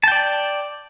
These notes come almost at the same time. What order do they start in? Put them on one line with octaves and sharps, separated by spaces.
A5 G5 D5